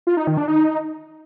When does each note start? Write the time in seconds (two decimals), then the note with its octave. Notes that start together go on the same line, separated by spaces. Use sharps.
0.07 F4
0.17 D#4
0.27 D#3
0.37 D4
0.48 D#4